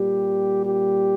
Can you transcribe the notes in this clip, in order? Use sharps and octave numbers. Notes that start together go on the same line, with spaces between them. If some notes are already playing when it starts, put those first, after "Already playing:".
Already playing: A#2 G3 G4
G4